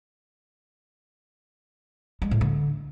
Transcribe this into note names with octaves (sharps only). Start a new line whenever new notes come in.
G#3
A2
D3